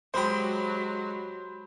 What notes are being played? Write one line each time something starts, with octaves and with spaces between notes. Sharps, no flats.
F#3 G#3 G4 C5 B5 C6